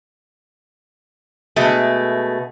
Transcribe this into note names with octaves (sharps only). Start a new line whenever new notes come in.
B2 G#3 A3